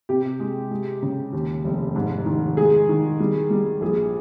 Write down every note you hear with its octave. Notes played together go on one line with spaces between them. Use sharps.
C3 G4
G#3
G#3
C#3
D#2
F1
G#2
D#3
G#3 G#4
D#3
G3
G3
A#1 G#4